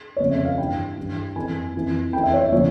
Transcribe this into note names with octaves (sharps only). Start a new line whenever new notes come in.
F2 C#3 F3 C#5
E5
F5
G2 E3 G5
G2 E3
F2 E3 G#5
F2 E3
F2 E3 G5
E5
C#5
E5
C#3 F3 C#5